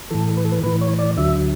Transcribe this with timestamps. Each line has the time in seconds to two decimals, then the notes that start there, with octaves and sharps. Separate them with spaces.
0.10 A2 E3 A4
0.37 B4
0.45 A4
0.52 B4
0.63 A2 E3 B4
0.81 C#5
0.99 D5
1.17 D2 D3 F#3 E5